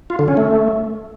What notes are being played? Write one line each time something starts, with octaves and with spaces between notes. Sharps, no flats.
F4
D3
C#4
A3